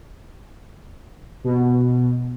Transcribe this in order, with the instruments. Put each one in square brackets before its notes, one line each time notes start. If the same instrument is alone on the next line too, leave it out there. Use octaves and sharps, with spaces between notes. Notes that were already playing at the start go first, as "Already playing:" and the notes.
[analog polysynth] B2